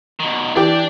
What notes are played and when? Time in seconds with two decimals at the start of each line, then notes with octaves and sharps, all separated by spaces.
0.20 B2 D#3
0.56 E3 D4 G4 D5